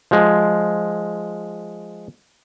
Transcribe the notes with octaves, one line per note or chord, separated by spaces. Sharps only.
F3 G#3